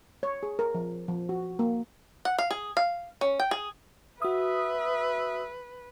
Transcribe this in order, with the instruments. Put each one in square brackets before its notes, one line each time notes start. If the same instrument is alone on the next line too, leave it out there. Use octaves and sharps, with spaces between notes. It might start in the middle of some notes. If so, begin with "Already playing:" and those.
[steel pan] C#5
G#4
A#4
F3
F3
F#4
A#3
[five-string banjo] F#5
F5
G#4
F5
C#4
G5
G#4
[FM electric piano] F#4 D#6 [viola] B4 [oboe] E5